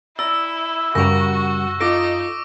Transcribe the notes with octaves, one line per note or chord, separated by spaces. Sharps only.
E4 D5 A#5 E6
F#2 C#3 G3 F#4 A#4 C#6 A#6
D#4 F4 A4 D6 A#6 D7